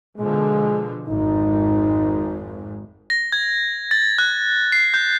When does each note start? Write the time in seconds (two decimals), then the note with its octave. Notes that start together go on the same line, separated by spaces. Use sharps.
0.17 B2 D3 F3 G#3
1.08 G#1 F2 G#2 D#4
3.10 A#6
3.32 G#6
3.91 A6
4.18 F#6
4.72 C7
4.94 G6